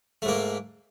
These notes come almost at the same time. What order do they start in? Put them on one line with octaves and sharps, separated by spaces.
A3 G#2 A#3